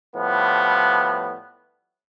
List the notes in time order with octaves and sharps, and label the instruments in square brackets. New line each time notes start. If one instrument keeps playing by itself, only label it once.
[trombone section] A2 F3 G3 B3